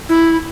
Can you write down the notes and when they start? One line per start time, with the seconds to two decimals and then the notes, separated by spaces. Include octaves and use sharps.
0.09 E4